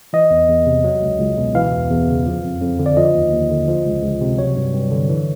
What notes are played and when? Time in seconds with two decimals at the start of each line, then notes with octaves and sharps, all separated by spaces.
0.13 E3 D#5
0.31 E2
0.49 E2
0.66 C3
0.84 F#3
1.02 C#2
1.20 C#2
1.38 B2
1.55 E3 F5
1.72 E2
1.90 E2
2.09 C#3
2.26 F3
2.43 F2
2.61 F2
2.79 D3
2.86 D5
2.97 F3 D#5
3.15 D#2
3.32 D#2
3.50 D3
3.68 F3
3.86 C#2
4.03 C#2
4.21 C3
4.38 F#3 C#5
4.56 G2
4.74 G2
4.91 D3
5.09 E3